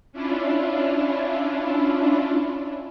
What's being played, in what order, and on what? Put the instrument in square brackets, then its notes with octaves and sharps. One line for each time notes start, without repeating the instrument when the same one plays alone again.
[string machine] C#4 D4 E4 F4